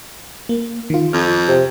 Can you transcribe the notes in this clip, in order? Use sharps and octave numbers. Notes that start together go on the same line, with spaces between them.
A#3
D#3 F4
F2 F6
C3